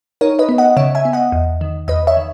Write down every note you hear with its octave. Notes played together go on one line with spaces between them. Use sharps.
D#4 A#4 C#5
B4 D#5
B3
D#5 F#5
C#3 C#5 E5
E5 G#5
B3
D#5 F#5
E2
D#3
E2 B4 D#5
C#5 E5
D#3